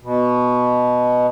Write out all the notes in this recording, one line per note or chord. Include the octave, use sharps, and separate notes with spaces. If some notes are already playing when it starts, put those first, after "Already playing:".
B2